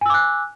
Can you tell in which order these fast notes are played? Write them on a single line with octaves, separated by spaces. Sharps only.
G#5 E6 D6 F#6